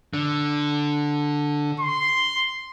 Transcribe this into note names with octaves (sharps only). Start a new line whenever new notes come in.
D3
C6